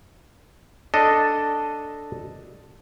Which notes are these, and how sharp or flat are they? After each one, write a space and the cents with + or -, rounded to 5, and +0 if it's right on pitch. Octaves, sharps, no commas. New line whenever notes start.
D4 +0 A4 +0 D#5 +0